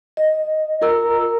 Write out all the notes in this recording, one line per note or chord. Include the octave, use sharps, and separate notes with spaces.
D#5
F4 A#4 A#5 E6